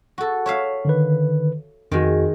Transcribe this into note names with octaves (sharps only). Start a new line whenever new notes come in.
F#4 A4
C#5 E5 F5
D3 D#3 B4
F2 D#3 G#3 F#4